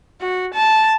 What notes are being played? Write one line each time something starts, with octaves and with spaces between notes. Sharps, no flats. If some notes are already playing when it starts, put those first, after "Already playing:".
F#4
A5